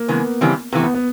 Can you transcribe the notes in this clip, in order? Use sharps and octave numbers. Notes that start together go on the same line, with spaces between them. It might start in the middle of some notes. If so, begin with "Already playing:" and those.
Already playing: A#3
C#3 E3 G#3 B3
C#3 E3 G3 C4
C3 E3 A3 B3
B3
B3